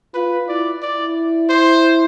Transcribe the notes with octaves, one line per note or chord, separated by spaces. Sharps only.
F4 B4
E4 D5
E4 D5
C5